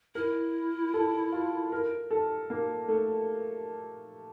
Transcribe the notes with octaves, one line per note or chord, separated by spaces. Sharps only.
E4 A#4
A4
F4
A#4
A4
A#3
A3